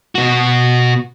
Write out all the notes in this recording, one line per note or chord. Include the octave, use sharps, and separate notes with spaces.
B2 F#4